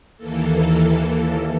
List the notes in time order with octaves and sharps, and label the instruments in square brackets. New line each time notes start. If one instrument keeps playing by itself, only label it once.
[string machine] D#2 E3 A#3 A4